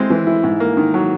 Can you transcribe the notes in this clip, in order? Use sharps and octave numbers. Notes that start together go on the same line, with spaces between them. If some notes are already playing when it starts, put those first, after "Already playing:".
Already playing: G#3 C4 E4
E3
E4
G#2
A#3
D#3
F#3